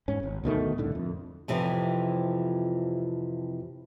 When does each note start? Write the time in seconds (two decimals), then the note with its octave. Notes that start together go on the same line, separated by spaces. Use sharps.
0.08 G#2 C#4
0.23 G#1
0.44 D2 B2 D#3 A3
0.77 C2 A2 D3
0.95 F2
1.48 F2 C3 E3 F3